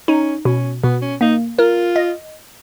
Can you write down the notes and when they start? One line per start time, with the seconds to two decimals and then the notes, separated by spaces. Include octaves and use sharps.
0.08 C#4 D#4
0.45 B2 C#4
0.83 B2 B3
1.02 C#4
1.21 A#3 D#4
1.58 F4 A#4
1.96 D#5